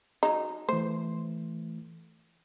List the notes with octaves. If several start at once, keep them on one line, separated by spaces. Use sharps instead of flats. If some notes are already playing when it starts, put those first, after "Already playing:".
F#3 G#3 D#4
E3 A3 C5